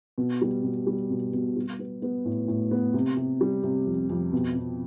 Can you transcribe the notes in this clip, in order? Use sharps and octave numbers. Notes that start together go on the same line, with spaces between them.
B2
G3
B2
G3
B2
B2
G3
B3
B3
A2
A2
B3
C3
C3
G3
C3
F2
F2
B2
B2